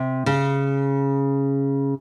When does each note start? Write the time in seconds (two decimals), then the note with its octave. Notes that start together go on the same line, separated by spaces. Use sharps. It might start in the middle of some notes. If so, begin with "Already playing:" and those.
Already playing: C3
0.26 C#3